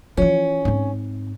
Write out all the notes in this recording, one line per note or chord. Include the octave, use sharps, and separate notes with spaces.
E3 F3 C#4
G#2 C4